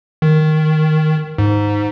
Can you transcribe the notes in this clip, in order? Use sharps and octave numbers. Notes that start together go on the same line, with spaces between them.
D#3
G#2